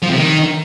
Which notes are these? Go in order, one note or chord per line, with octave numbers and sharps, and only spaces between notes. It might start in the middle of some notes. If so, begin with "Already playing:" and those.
F3
C3
D#3